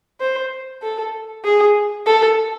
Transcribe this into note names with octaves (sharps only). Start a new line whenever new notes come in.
C5
A4
G#4
A4